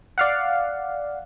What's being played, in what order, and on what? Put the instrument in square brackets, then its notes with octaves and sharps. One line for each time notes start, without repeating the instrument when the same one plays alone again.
[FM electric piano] D5 F5 F#5